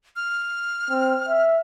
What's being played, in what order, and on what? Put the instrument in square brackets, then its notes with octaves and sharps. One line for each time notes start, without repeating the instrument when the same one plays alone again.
[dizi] F6
[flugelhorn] C4
E5